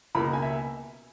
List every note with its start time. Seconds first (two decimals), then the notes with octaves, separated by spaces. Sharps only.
0.15 C#2 B2 A#3 B5
0.24 A#5
0.33 G#5
0.42 E5